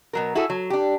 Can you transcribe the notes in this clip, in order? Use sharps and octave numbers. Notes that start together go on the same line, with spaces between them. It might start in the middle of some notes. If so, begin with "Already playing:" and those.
B2 F#3 A#4
E4 F#4 G#4 A4
F#3
D4 G4